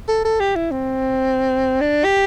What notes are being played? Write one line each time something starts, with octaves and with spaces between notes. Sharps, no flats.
A4
A4
G4
E4
C4
D4
G4